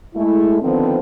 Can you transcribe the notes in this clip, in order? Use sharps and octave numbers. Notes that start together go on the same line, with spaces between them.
G#3 A3 E4
D3 D#3 F3 B3 C4